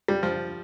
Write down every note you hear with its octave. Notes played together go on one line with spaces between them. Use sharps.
G3
F3